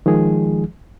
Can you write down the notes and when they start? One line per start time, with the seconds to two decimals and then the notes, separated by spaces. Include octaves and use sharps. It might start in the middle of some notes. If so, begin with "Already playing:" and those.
0.06 D#3 F3 G#3 G#4